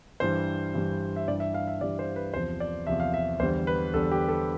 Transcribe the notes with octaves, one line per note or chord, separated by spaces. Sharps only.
G2 E3 G3 C5
G2 E3 G3
E5
G2 E3 G3 D5
E5
F5
E5
G2 E3 G3 D5
C5
B4
E2 C3 F3 C5
D5
E2 C3 F3 E5
F5
E5
E2 D3 G3 C5
B4
E2 D3 G3 A4
G4
A4